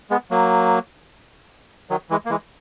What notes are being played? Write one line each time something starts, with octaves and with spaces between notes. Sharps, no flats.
G#3 B3
F#3 A#3
D#3 F#3
E3 G#3
A#3
E3 G#3